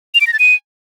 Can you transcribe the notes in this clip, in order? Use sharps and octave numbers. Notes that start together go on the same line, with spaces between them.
F7
D7
A#6
A6
D#7